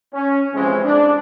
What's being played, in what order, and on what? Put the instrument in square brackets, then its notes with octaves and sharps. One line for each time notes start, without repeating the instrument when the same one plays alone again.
[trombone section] C#4
C3 E3 F3 G#3 C4
D4